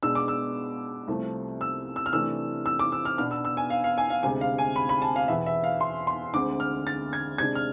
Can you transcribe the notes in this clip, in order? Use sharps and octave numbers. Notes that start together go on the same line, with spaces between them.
B2 G#3 D4 E6
D6
E6
C2 C3 F3 A3
E6
E6
F6
C3 E3 A3 D4 E6
E6
D6
E6
F6
B2 B3 D4 F6
E6
E6
G#5
F5
F5
G#5
F5
D2 C3 G#3 G#5
F5
G#5
B5
B5
A5
F5
E2 B2 B3 E5
E5
F5
C6
C6
D2 D3 G#3 C4 D6
F6
A6
G#6
C3 G#3 D4 G#6
F6